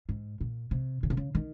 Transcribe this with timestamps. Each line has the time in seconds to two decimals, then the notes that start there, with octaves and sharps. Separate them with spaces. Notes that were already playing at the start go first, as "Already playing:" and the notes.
0.09 G#2
0.41 A#2
0.71 C3
1.03 C#3
1.10 C3
1.17 C#3
1.35 D#3